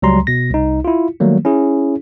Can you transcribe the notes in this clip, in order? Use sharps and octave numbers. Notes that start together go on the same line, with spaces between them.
C#2 F#3 G3 A#5 C6
B2 A#6
C2 D#4
E4 F4
D#3 F#3 G3 A3 A#3
C#4 E4 G#4